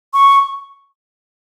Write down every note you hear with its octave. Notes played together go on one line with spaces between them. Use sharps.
C#6